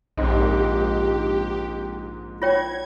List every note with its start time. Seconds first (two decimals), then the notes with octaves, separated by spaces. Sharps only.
0.17 A#1 G#2 C4 D#4 G4
2.42 F4 C#5 G5 G#6